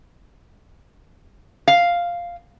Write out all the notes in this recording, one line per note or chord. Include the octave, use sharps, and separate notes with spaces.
F5